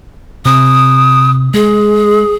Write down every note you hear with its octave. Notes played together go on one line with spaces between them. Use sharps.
C3 C4 D#6
G#3 G#4